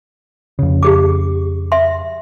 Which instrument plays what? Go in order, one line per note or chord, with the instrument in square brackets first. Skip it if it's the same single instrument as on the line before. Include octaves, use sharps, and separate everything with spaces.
[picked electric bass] F2 C#3
[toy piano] G4 G#4 D6
E5 C6